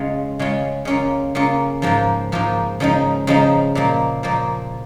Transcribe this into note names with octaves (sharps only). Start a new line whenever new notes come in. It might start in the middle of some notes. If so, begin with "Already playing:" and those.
Already playing: C#3 G#3 C#4 F4
C#3 G#3 C#4 F4
C#3 A#3 C#4 F4
C#3 A#3 C#4 F4
G#2 F3 A#3 F4
G#2 F3 A#3 F4
C#3 F3 G#3 D#4
C#3 F3 G#3 D#4
A#2 F3 A#3
A#2 F3 A#3